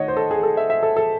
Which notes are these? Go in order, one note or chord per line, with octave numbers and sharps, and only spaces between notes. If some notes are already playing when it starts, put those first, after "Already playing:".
Already playing: D#3 A3 C#5 D#5 F#5
C5
A4
G#4
A4
E5
E5
A4
A4